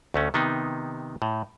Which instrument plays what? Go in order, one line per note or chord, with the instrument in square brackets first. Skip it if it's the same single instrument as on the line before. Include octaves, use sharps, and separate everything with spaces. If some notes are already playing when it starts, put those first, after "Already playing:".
[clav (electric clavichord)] D2 A3 C#4
C3 D#3 B3 D#4
A2